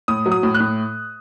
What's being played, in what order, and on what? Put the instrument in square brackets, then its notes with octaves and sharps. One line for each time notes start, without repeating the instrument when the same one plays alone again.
[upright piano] A2 D#6
F#3
D#6
A2
F#6
A2